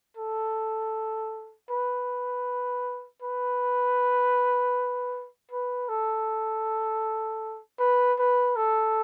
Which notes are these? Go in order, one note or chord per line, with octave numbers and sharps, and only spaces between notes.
A4
B4
B4
B4
A4
B4
B4
A4